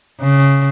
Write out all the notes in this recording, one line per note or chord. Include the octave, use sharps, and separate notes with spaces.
C#3